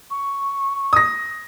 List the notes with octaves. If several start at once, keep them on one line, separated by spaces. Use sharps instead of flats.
C#6
D#6 A#6